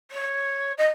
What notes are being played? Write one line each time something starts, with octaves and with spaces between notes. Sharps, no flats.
C#5
D#5